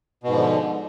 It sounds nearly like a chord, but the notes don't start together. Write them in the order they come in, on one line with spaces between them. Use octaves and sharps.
B2 G#2 F3 D3